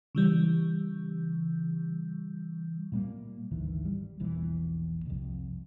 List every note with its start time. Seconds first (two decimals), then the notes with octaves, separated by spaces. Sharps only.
0.15 C#3 E3 G3
2.92 A#2 G3 A#3
3.51 G#1 D2 D#3 E3
3.85 G3
4.20 E1 A#1 A#2 E3
5.06 C2 F2